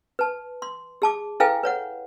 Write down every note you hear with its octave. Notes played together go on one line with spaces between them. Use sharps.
B4 A5
C6
G#4 A5 D6
E4 A4 B4 F5 G5 G#5
B4 C#5 F#5